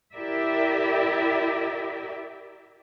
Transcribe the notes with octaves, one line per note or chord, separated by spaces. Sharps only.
E4 G4 A#4 D5 E5